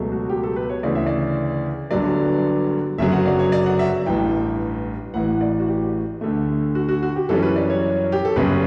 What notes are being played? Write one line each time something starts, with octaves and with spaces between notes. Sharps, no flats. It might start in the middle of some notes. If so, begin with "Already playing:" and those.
Already playing: C#2 B2 F#3 A3
F#4
G4
A4
B4
C#5
D2 C#3 E3 D5
E5
D5
G1 G2 D3 F#3 D5
G1 F#2 C#3 F#3 E5
F#5
D5
C#5
D5
F#5
E5
A1 G2 E3 G5
A1 A2 E3 F#5
D5
F#4
G4
D2 D3 A3
F#4
F#4
F#4
G4
F#2 E3 G3 C#4 A4
B4
D5
C#5
G4
A4
G1 F#2 C#3 G3 C#4 B4